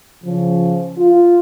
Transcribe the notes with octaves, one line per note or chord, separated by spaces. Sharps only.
C#3 F3
F4